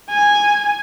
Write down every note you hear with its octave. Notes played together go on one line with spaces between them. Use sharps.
G#5